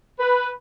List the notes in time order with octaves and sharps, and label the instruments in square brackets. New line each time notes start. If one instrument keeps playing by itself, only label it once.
[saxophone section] B4